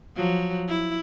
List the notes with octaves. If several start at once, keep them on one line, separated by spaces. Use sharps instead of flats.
F3 F#3
E4